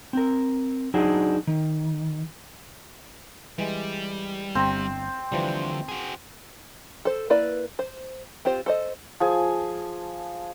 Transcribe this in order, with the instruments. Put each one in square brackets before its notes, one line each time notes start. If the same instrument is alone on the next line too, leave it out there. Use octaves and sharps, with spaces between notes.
[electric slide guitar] C4 A#4
F#3 D4 D#4 F#4 G#4 C5
D#3
[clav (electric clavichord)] E3 G#3 [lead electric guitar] G3
[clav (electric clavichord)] G1 A#5 [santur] C4
[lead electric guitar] D2 D3 [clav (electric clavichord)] E3 F3 G3
[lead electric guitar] F#4 G#4
[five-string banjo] A4 C5
A#3 E4 B4 D5
C5
C4 F4 G4 C5
A4 C5 D#5
[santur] F3 G#4 G#5